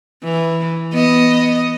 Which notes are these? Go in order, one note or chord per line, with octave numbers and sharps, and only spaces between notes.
E3
B3 D#5